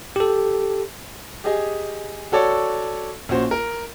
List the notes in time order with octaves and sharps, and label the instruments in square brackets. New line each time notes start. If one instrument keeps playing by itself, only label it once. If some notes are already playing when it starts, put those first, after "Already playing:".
[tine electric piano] G4 A4
[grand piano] G4 G#4 D#5 G#5
F#4 A4 C#5 D5
A#1 C#4 F#4 C5
A#4